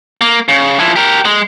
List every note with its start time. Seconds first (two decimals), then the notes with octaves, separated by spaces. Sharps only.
0.21 A#3
0.49 C#3
0.79 F3 E4
0.96 G4 A#4
1.25 G#3